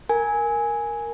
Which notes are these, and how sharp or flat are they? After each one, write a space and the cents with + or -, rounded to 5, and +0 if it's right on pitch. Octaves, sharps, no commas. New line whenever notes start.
A#4 +0 G#5 +0